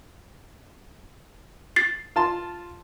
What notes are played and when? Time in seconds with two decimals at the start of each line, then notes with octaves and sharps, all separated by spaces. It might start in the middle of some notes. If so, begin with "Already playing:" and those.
1.76 A6 C7
2.16 F4 A5 C6